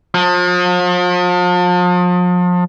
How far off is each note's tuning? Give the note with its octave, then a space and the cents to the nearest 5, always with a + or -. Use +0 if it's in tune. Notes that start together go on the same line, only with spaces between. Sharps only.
F3 +40